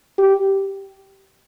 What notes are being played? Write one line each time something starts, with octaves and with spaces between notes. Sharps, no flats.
G4